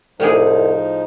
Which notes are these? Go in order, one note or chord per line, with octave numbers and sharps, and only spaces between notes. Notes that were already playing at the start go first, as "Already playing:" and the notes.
C2 A2 F3 G3 D#4 G#4